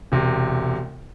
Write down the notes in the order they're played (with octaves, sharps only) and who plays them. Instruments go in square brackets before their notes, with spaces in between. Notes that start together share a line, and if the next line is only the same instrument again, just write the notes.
[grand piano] E1 C3